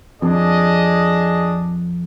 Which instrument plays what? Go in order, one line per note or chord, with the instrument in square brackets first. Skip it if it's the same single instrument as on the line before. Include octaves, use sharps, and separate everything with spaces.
[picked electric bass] F2 [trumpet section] D4 G#4 D#5